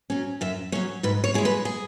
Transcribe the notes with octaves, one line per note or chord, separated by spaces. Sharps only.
F#3 C#4
F#2 E5
F#3 C#4 C#5
G#2 B4
C#5
G#3 E4 G#4
B4
G#4